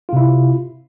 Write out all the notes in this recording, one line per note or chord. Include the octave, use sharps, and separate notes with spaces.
C3 E4 F4